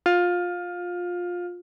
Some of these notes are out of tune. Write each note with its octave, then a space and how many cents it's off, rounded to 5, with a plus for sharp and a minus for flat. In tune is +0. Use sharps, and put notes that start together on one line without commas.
F4 +20